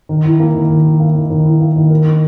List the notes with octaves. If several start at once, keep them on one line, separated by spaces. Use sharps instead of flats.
D#3
E4
A#3
D#3
D#3
E4
A#3
D#3
D#3
E4
A#3
D#3
A#4
D#4